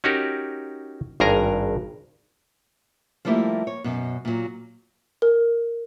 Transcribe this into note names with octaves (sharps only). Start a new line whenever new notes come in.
C#4 D#4 F#4 G4 A#4
G#1 G2 G#4 A#4 A#5
F3 G3 A3 A#3 E4 G4
C#5
F#2 B2
A#2 F#3
A#4